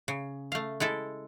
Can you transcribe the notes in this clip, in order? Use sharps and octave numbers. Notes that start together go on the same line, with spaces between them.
C#3
A3 F5
G#3 E4 A4